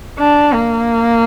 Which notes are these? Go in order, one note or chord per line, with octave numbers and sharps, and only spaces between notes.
D4
A#3